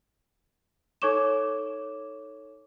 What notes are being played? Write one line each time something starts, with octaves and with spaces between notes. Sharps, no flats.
D#4 A4 C#5 C#6 D6 E7